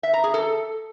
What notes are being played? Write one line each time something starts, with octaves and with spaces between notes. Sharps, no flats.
E5
A#5
G#4
A4